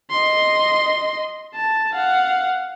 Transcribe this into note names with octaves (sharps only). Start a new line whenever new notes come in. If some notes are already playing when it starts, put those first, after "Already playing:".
D#5 C6
A5
F5 F#5